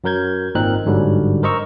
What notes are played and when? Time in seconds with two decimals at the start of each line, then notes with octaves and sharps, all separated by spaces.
0.04 F#2 F#3 A#4 G6 G#6
0.55 G#1 A#2 C4 D#4 A#4 F#6
0.86 G1 G#2 D3 F#3 G3
1.43 A#4 C5 D#5 A#5 C#6 E6